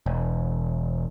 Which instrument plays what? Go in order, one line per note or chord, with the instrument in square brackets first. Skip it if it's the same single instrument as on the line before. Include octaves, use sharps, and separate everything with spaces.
[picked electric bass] E1